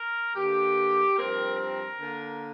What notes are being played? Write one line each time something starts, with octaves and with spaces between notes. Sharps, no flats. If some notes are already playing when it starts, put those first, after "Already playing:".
Already playing: A#4
D3 A#3 G4
G2 F3 C4 A#4
A#4
D3 A#3